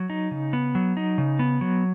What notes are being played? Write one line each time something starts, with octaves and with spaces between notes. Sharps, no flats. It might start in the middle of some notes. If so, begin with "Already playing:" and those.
Already playing: F#3
D#4
C#3
B3
F#3
D#4
C#3
B3
F#3